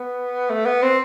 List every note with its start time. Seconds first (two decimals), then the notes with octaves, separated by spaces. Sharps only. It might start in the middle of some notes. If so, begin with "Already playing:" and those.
Already playing: B3
0.50 A3
0.66 B3
0.83 C4